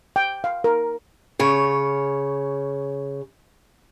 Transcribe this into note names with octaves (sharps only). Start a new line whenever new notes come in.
G5
F5
A#4
C#3 C#5